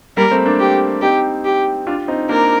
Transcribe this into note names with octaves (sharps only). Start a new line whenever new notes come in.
G3 A#3 A#4
A3 C4
A#3 D4
G4
C4 D#4 G4
G4
D4 F4
C4 D#4
A#3 D4 A#4